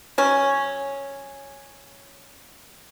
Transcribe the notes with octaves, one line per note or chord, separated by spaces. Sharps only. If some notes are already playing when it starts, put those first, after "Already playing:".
F#3 C#4